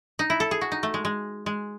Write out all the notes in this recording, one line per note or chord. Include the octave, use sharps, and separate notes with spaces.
D#4
E4
A4
G#4
F#4
D#4
A3
G#3
G#3
G#3